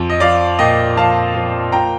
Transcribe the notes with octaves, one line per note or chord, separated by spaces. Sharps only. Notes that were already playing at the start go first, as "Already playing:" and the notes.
Already playing: F2
D#5
F3 D5 F5
A#2 D#5 G5
F3 F5 A5
F3
A#2 G5 A#5